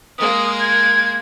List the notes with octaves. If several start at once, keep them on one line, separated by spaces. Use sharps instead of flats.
G#3 A#3 D#6
G#6